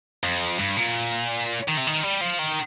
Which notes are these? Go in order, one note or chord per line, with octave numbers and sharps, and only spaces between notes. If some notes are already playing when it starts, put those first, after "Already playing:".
F2
G2
A#2
D#3
C3
D#3
G3
F3
D#3